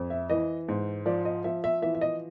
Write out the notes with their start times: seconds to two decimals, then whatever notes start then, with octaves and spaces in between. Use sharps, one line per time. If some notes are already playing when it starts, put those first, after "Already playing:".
Already playing: F2
0.10 E5
0.30 E3 D#5
0.68 G#2
1.06 F3 D5
1.25 D#5
1.44 F3 E5
1.64 E5
1.82 E3 E5
1.95 E5
2.01 D#5